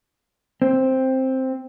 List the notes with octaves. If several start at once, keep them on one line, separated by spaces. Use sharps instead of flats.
C4